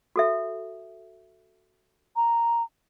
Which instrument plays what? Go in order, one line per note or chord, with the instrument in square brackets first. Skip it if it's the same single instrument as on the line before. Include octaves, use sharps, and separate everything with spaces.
[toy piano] F#4 A4 E5
[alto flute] A#5